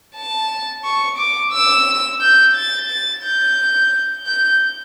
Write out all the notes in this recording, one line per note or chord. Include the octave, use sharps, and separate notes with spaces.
A5
C#6
D6
E6
G6
A6
A6
G6
G6